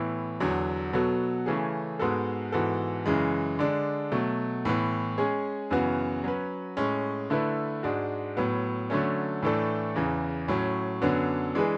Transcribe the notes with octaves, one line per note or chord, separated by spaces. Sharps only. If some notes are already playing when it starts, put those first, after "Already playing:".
Already playing: A2 E3 B3 E4
E2 D3 F#3
B2 F#3 B3 F#4 A4
C#3 E3 A3 C#4 G#4
G#2 G#3 B3 F#4 A4
G#2 E3 B3 F#4 A4
F#2 C#3 E3 G#3
D3 G#3 D4
B2 F#3 A3
A2 E3 B3
G#3 C#4 G#4 C#5
F#2 C#3 E3 B3 F#4
F#3 C#4 F#4 B4
A2 G#3 C#4
D3 A3 E4 B4
G#2 G#3 D4 F#4
A2 F#3 B3
D3 F#3 A3 C#4
A2 E3 A3 D4 A4
E2 C#3 E3
A2 F#3 C#4
F#2 D3 F#3 B3 D4
E3 G#3 D4 G#4 B4